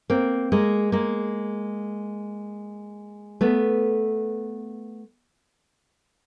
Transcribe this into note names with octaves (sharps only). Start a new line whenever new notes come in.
A#3 C4
G#3 A#3
G#3 A#3
A3 B3